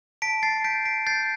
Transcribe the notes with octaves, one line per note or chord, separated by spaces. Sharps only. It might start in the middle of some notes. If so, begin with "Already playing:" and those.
A5 B6 D7
A5 A6 C7
G6 B6 D7
A5 B6 D7
G6 A6 C7